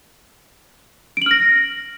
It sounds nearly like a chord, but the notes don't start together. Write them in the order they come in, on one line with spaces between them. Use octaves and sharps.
D7 F#7 F6 A#6